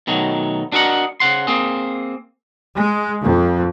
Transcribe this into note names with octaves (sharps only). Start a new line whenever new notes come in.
B2 D#3 F#3 A3
D4 F#4 A#4 D#5 F#5
C#3 C5 F#5 C6
A#3 C4 G#4
G#3
F2